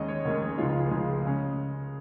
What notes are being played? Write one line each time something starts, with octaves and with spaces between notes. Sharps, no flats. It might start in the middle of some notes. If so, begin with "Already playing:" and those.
Already playing: D#2 D#3 G#3 C#4 D#5
C#5
D#2 D#3 G#3 C#4 A#4
G#4
C#2 C#3 F3 G#3 F4
F4
G#4
C#2 C#3 F3 G#3
C#3 G#3 C#4